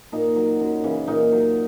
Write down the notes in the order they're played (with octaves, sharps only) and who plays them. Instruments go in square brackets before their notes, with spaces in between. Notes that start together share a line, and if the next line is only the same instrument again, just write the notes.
[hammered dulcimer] A#2 D#4
F#3
F#2
C#3 E3
A#2 D#4
F#3